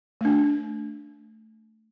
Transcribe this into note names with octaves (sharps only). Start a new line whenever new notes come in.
A3 D4